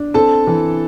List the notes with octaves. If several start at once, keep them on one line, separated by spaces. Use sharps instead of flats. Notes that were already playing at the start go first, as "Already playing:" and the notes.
Already playing: D4
C4 A4 A5
E3